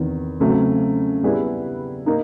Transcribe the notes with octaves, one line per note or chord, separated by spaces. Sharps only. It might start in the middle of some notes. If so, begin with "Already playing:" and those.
Already playing: E2 C3 D#3
C#3 F#3 A3 C4
G3 B3 E4 G#4 B4
A#3 D#4